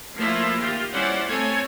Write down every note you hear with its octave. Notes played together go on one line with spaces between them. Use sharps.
F3 A3 A#3 E4 F4
D#3 F4 G4
G3 C#4 E4 C5 D5 F#5
A3 C4 A4 C#5 G#5